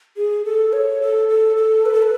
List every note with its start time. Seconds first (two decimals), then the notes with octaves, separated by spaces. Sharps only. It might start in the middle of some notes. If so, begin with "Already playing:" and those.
0.16 G#4
0.44 A4
0.73 C#5
1.01 A4
1.29 A4
1.57 A4
1.85 B4
1.93 A4
2.02 B4